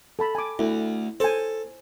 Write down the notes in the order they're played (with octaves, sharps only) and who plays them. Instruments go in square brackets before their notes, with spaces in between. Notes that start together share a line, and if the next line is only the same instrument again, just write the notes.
[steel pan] A4 A5 B5
G#5 D6
[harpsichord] D2 [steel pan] E4
[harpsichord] A4 [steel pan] C5 G#5